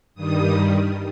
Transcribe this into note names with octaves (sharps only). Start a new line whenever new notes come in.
G2 D#3 G3 D#6